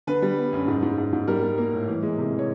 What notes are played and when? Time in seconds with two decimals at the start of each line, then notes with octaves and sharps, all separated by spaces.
0.07 D3 B4
0.22 G3
0.37 B3
0.53 F#2
0.68 G#2
0.82 G#2
0.98 G#2
1.13 G#2
1.28 G3 A#4
1.43 G3
1.58 A#3
1.73 A2
1.88 E3
2.03 G#3
2.18 C3
2.34 E3
2.39 C#5